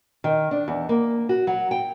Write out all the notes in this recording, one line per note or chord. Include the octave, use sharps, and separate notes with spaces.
D#3
D4
E2
A#3
F#4
F#3
G5